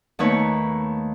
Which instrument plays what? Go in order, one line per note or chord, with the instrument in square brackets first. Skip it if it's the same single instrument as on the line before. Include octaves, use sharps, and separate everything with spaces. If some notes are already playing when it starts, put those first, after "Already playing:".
[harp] D#2 A3 B3 D#4 B4 C#5